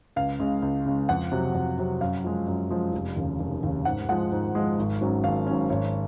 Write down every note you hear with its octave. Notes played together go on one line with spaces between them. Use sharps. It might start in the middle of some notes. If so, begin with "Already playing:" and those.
C#2 F5
C#3 G#3
C#2
C#3 G#3
F2 F#5
C3 F#3
F2
C3 F#3
F#2 F5
F3 G#3
F#2
F3 G#3
F1
D#2 C#3
F1
D#2 C#3
G#2 F#5
F3 G#3 F#5
G#2
F3 G#3
G#1
G#2 F#3 C#4
G#1 F5
G#2 F#3 C#4
G#1 C#5